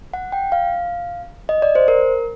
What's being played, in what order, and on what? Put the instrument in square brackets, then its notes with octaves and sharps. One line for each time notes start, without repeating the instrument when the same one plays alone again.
[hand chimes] F#5
G5
F5
D#5
D5
C5
A#4